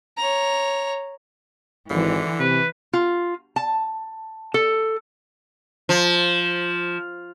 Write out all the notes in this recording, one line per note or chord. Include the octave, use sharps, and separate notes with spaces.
C#5 A#5
G#1 D3 E3
C3 B4
F4
A5
A4
F3